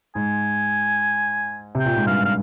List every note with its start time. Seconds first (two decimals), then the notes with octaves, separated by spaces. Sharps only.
0.15 G#2 G#5
1.75 C3 G5
1.85 A#2
1.96 G#2
2.07 G2 F5
2.25 F5